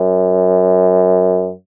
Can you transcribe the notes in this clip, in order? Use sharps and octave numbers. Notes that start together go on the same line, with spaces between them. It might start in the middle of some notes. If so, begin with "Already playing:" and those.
Already playing: F#2